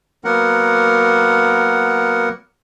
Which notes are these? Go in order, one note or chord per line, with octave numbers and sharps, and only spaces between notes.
F#3 A#3 B3 A#4 F#5